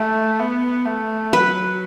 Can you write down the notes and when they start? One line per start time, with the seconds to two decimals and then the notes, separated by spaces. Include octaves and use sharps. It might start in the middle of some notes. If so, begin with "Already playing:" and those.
Already playing: A3
0.40 B3
0.86 A3
1.33 F#3 B4